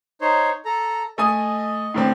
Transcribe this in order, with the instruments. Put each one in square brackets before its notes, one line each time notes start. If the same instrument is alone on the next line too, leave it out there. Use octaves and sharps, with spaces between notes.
[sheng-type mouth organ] D#4 C5 C#5
A4 A#5
[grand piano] A3 G#5 D#6 [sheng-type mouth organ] D#5
[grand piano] A2 D3 C4